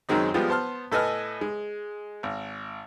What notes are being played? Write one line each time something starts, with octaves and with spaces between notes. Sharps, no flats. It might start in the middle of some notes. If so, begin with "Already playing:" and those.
F#2 D#3 F#3 G#3 C4 D#4
F3 G3 G#3 B3 F4
B3 C5 A5 C6 F6
A2 A4 B4 D#5 G#5 F6
G#3
G#1